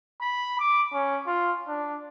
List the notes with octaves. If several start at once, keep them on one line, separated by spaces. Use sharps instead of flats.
B5
D6
C#4
F4
D4